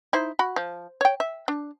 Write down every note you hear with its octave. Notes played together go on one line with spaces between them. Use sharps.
D#4 E4 C5
F#4 B5
F3
C#5 G5
E5
D4